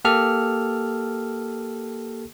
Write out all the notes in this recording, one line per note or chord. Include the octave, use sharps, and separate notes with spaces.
A#3 G4 A4 F6